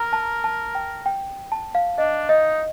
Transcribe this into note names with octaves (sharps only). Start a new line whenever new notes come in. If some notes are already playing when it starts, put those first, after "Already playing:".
Already playing: A#4 A#5
A5
A5
G5
G5
A5
F5
D4 D#5
D#4 D#5